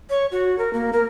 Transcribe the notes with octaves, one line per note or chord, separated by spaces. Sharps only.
C#5
F#4
A#4
A#3
A#4